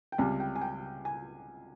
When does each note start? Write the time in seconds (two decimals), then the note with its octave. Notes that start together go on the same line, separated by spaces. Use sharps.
0.12 G5
0.18 C#2 C3 G3 G#5
0.40 G5
0.56 G#5
0.61 G5
1.05 G#5